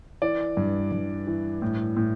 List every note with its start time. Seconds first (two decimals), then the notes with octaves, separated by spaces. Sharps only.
0.22 E3 D5
0.57 G2
0.92 G2
1.27 E3
1.62 A2
1.97 A2